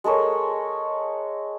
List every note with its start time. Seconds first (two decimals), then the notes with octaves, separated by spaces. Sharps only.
0.04 G#3 A4 A#4 C#5